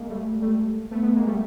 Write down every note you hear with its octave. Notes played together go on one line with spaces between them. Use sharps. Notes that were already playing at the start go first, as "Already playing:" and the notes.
Already playing: G#3 A#3
G3 A3
G3 A3
A3 B3
A3 B3
G#3 A#3
G3 A3